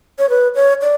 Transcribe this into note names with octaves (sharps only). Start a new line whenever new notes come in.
C#5
B4
C#5
D5